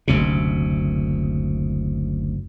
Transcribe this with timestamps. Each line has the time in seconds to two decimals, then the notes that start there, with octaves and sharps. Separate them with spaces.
0.08 F#1 D2 C3